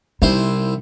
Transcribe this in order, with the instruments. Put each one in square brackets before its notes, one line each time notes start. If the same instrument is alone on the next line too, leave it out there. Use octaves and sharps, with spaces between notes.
[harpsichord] C2 E4 C5 [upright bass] D#4